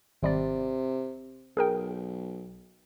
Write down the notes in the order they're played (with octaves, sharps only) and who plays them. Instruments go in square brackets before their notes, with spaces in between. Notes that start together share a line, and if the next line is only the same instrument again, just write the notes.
[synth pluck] G#1 G3 D5 [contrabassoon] C3
[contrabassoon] B1 [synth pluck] G#4 A#4 G5